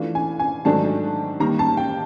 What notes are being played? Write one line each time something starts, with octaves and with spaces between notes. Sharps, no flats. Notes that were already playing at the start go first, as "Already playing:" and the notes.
Already playing: E3 A3 D4 F4
G#5
G#5
G#2 D#3 F#3 A3 D4 A5
D#3 G3 A#3 A#5
A5
G5